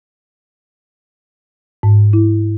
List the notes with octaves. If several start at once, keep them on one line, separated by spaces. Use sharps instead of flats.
G#2
E4